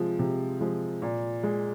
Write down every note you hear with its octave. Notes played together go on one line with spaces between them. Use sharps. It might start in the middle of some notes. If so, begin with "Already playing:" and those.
Already playing: C3 F3 G#3
C3
F3 G#3
A#2
G#3